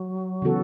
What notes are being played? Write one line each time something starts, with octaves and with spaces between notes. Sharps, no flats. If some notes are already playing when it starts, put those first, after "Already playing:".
Already playing: F#3
C#3 E3 B3 F#4 A4